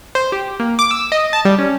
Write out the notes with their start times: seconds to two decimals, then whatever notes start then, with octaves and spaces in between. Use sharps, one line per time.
0.15 C5
0.32 G4
0.60 A#3
0.79 D6
0.91 E6
1.12 D#5
1.33 A5
1.45 G3
1.58 C#4